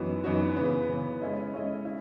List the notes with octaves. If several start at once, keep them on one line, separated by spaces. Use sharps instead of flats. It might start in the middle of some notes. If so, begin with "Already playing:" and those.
Already playing: F#2 E3 B3 D#4 F#4
F#2 E3 B3 D#4 F#4
C#3 E3 B3
C#3 E3 B3
G#3 C#4 E4 A4 D#5
G#3 C#4 E4 A4 D#5
E4